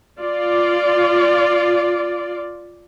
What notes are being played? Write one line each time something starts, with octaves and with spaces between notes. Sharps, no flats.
F4 D5